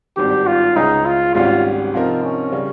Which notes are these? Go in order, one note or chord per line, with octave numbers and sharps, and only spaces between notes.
G#1 G2 D#3 G4
F4
C#2 C#3 G#3 C#4 D#4 G#4
F4
G#1 G#2 G3 C#4 F4 G4
C3 F3 C4 D#4 F4 A#4
C#4
C#3 G3